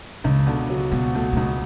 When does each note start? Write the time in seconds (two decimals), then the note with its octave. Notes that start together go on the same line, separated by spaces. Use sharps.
0.24 C#2 C#3
0.46 B2 D3
0.70 F#3
0.92 B2 G#3
1.15 B2 A3
1.33 A3
1.37 C#2 G#3